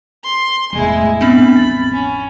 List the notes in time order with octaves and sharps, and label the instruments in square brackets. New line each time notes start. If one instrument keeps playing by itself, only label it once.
[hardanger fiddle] C6
[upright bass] E1 A2 [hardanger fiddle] G#3 E4
[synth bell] B3 C4 D4 [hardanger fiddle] B5
[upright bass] A1 F2 [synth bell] A6
[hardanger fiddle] C#4